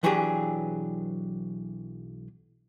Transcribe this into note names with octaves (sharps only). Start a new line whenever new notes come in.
B1 E3 F#3 D4 G4 G#4